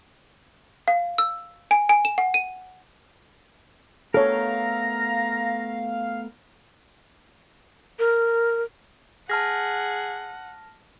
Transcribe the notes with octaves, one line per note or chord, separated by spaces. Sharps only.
F5
E6
G#5
G#5
E7
F#5
D#7
A3 B3 A4 A#4 C#5 F5 A#5
A#4
G#4 F#5 A5 F6 A#6